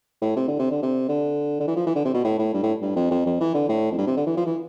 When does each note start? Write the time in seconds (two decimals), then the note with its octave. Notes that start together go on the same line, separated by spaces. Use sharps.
0.22 A2
0.36 C3
0.48 D3
0.59 C3
0.71 D3
0.82 C3
1.09 D3
1.60 D3
1.67 E3
1.76 F3
1.86 E3
1.95 D3
2.05 C3
2.14 B2
2.24 A2
2.39 A2
2.54 G2
2.63 A2
2.82 G2
2.96 F2
3.10 F2
3.26 F2
3.40 E3
3.54 D3
3.69 A2
3.91 F2
3.98 G2
4.07 C3
4.17 D3
4.26 E3
4.37 F3
4.46 E3